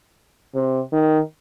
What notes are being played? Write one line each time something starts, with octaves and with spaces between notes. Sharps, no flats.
C3
D#3